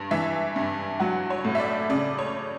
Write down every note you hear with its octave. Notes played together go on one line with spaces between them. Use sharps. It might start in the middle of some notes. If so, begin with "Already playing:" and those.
Already playing: G2
E3 E5
G2
F#3 F#5
C#5
A2
E5
D5
C#3 D5
C#5